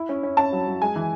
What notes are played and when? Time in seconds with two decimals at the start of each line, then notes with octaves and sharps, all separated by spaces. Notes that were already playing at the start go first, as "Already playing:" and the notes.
Already playing: E4
0.09 C#4
0.23 C#4
0.37 C#4 A5
0.52 F#3
0.67 F#3
0.82 G#3 G#5
0.96 E3